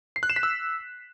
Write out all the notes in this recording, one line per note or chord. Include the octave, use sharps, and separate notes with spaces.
C7
F#6
E7
B6
E6